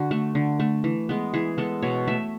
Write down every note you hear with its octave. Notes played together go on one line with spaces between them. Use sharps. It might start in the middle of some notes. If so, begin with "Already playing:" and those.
Already playing: D3 F#4
A3
D3
A3
E3
G#3 B3
E3 G#4
G#3 B3 A4
B2 C#5
A3 E5